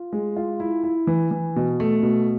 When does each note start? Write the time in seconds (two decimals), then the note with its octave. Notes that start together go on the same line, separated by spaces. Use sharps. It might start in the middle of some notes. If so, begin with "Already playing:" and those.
Already playing: F4
0.13 G#3
0.37 F4
0.60 E4
0.84 E4
1.07 E3
1.31 E3
1.56 B2
1.80 A3
2.03 B2